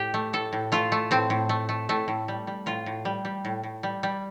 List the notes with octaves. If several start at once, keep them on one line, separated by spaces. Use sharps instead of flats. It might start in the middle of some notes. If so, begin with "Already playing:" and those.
Already playing: A2 G4
A3
A2 A4
A2
A3 F4
A3
A2 C4
A2
A3
A3
A2 A3
A2
G3
G3
A2 F4
A2
G3
G3
A2
A2
G3
G3